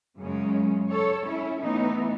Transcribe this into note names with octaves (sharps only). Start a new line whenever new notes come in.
F#2 C#3 G#3 C#4
A4 C#5
C#4 E4
A2 E3 B3 D#4